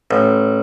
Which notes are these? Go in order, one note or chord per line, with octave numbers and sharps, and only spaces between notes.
A1